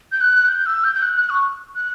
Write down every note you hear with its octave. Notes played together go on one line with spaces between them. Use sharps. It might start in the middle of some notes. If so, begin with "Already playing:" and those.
G6
F#6
G6
E6
G6
G6
F#6
F#6
C#6
F#6